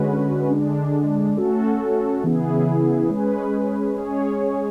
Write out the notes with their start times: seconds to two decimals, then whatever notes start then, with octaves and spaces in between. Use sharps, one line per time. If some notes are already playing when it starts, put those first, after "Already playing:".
Already playing: D3 G#3 C#4 F#4 B4
0.51 D3 G#3 D4
1.37 A3 C#4 F#4 A4
2.23 C#3 E3 B3 E4 G#4
3.09 G#3 C#4 G#4 B4
3.95 G#3 C#4 G#4 C#5